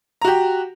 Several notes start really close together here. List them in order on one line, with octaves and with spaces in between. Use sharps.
A#5 F#4 G4